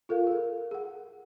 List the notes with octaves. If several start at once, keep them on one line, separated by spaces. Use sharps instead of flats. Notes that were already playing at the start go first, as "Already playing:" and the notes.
F4 A4 A#4 F5
G#4 A#4
G#4 F#5